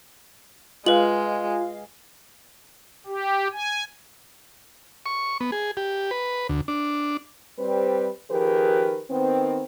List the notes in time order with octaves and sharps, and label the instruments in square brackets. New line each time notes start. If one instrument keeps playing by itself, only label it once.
[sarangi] G#3 [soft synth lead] F4 [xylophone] B4 F#7 [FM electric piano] D#5 F5
[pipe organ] G4
G#5
[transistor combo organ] C#6
B3
G#4
G4
B4
D2
D4
[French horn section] G3 C4 B4
D#3 F3 G4 G#4 A#4 B4
D#3 B3 C4